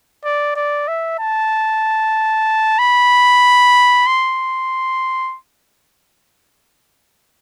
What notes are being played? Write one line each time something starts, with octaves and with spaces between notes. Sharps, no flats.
D5
D5
E5
A5
B5
C6